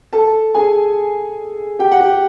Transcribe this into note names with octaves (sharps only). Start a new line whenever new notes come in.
A4 A5
G#4 G#5
G4 G5
F#5
G4 G5